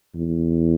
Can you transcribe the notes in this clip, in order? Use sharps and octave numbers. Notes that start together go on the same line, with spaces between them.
E2